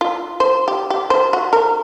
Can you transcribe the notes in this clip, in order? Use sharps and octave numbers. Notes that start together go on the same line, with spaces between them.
F4
C5
G4
G4
C5
F#4
A#4